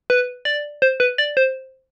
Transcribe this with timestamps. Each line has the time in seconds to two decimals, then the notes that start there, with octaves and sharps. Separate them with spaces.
0.10 B4
0.45 D5
0.82 C5
1.00 B4
1.18 D5
1.37 C5